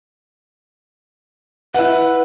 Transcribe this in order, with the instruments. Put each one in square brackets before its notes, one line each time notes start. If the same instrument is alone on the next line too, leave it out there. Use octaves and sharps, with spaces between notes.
[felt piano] E4 F#5 [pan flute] B4